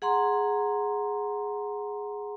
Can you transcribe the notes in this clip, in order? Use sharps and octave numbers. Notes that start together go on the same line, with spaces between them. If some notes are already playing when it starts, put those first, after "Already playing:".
G#4 F#5 A#5 C6